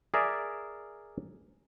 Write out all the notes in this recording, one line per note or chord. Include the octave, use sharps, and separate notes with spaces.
G#4 A#4 D5 E5